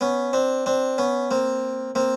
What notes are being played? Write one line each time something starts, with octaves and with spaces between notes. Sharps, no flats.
B3 C#4
C4 D4
C4 D4
B3 C#4
A#3 C4
A#3 C4